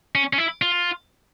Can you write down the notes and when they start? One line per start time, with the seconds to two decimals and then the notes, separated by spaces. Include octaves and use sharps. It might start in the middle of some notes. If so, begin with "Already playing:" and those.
0.15 C#4
0.33 C#4
0.38 E4
0.62 F4